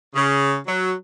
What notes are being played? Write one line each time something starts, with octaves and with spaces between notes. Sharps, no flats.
C#3
F#3